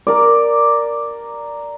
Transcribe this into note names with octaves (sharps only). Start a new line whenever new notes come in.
A#4 D5